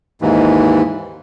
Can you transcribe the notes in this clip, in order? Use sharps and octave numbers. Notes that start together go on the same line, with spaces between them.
D#2 G#2 E3